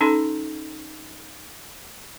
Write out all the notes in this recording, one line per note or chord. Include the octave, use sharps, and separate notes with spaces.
C#4 D#4 A4 A5 C6